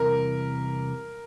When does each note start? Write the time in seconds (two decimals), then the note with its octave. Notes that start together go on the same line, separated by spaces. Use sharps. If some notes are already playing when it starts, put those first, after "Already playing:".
Already playing: E2 C3 E3 G3 A#4